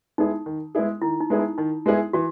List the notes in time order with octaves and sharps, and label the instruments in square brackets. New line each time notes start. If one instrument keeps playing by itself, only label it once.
[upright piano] G#3 B3 E4 G#4 [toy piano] D#4
[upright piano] D#3
G#3 B3 E4 G#4
[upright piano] D#3 [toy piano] E4
[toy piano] D#4
[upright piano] G#3 B3 E4 G#4
[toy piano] D#4
[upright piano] D#3 [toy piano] D#4
[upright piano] G#3 B3 E4 G#4
[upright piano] E3 [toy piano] F#4